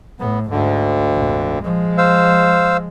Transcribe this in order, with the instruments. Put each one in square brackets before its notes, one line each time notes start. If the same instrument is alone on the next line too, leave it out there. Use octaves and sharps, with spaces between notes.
[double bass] A2 [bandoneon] B3
[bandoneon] D2 D3 [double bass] G#2
[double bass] A#1 F2
F3 G#3
[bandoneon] C5 F5 E6